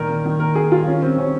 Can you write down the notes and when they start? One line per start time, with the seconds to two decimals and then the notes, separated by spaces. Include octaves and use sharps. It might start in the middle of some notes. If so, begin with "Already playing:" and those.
Already playing: A#2 D#3 A#4
0.09 A#3
0.25 D#3
0.40 A#3 A#4
0.55 A#3 G#4
0.72 G3 F4
0.87 D#3 C#4
1.02 G3 C4
1.18 D#3 C#4